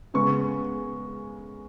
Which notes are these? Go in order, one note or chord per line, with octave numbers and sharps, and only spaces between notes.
C#3 G#3 B3 C#6